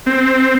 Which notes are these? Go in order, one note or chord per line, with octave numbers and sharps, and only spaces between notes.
C4